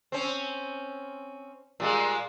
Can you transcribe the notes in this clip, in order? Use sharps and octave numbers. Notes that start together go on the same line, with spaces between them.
C4 C#4
A#2 G3 G#3